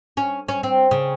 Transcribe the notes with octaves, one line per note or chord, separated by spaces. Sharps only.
C#4
C#4
C4
C#3